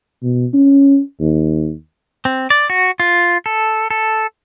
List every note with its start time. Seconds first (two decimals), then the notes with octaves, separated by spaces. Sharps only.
0.22 B2
0.54 C#4
1.20 D#2
2.25 C4
2.50 D5
2.70 F#4
3.00 F4
3.46 A4
3.91 A4